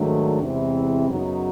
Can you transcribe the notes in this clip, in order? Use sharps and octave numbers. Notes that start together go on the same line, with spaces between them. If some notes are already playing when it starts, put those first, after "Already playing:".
Already playing: G#2 D#3 F#3 A3 D4
E2 C3 E3 G#3 C4
F#2 C#3 F#3 B3 D#4